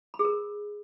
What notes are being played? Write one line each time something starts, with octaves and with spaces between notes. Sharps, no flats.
B5
G#4
A#4